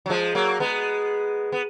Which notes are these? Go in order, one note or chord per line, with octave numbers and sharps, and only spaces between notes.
F#3
F3 G#3
F#3 A#3
G#3 B3
B3